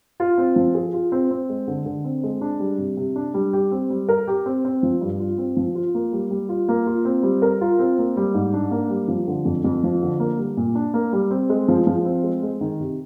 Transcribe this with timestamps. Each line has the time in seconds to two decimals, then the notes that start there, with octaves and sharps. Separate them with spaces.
0.20 F4
0.38 C4
0.56 F3
0.75 G#4
0.94 F4
1.12 C4
1.31 C4
1.49 G#3
1.68 D3
1.86 D3
2.04 C4
2.23 G#3
2.41 D4
2.60 G3
2.78 C3
2.97 C3
3.16 D4
3.34 G3
3.53 G4
3.71 C4
3.90 G3
4.09 A#4
4.27 G4
4.46 C4
4.65 C4
4.83 F3
5.01 G2
5.20 F4
5.38 C4
5.57 F3
5.75 F4
5.94 A#3
6.13 G3
6.30 G3
6.49 F4
6.68 A#3
6.87 F4
7.05 C4
7.23 G3
7.42 A#4
7.61 F4
7.79 C4
7.98 A#3
8.17 G3
8.34 G#2
8.54 D4
8.71 A#3
8.90 G3
9.08 F3
9.28 D3
9.45 F2
9.64 F2
9.84 F3
10.02 D3
10.20 A#3
10.38 G3
10.57 A#2
10.75 D4
10.94 A#3
11.13 G3
11.31 C4
11.50 G#3
11.68 F3
11.87 F3
12.05 C4
12.23 G#3
12.43 G#3
12.61 D#3
12.80 C3